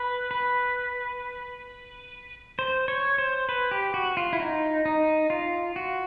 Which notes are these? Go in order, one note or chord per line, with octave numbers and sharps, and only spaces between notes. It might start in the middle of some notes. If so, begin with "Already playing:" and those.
Already playing: B4
B4
C5
C#5
C5
B4
G4
F#4
F4
E4
D#4
D#4
F4
F#4